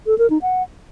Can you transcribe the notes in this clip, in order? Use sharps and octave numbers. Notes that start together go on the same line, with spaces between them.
A4
A#4
D#4
F#5